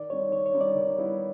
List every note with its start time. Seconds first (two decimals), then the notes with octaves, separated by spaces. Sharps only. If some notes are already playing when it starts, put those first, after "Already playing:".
Already playing: D#3 D5
0.10 G3 C4 D#4 C#5
0.32 D#3 C#5
0.46 C#5
0.54 G3 C4 D#4
0.61 D5
0.75 D#3
0.98 G3 B3 E4